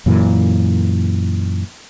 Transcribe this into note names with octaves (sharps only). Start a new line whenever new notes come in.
F#2 A#2 E3